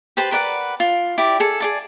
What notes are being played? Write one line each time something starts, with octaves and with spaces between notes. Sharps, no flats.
G4 B4 C5 A5
A#4 B4 D5 F#5
F4
E4 G4 D5 D6
G#4 A4
G#4 D5 A5